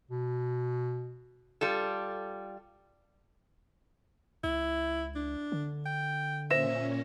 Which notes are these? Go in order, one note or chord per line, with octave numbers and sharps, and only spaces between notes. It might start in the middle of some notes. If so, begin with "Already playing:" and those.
B2
G3 F4 A4
C#2 E4
D4
D3
G5
A#2 C#4 C5 E5 A#6 E7